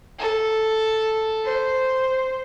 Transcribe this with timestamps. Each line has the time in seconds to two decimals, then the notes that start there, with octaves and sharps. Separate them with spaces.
0.19 A4
1.44 C5